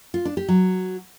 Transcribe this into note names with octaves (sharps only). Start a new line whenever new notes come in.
F4
D4
G4
F#3